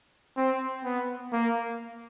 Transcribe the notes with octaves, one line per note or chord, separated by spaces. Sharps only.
C4
B3
A#3